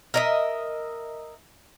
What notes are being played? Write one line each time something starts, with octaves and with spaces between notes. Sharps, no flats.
A#4 D#5 E5